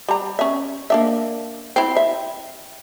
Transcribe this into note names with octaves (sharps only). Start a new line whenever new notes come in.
G3 A#5
C#4 E5
A#3 D4 E5
C4 E4
E5